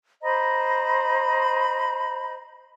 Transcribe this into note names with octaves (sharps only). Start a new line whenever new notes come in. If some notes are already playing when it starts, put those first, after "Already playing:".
C5 D#5 A#5 B5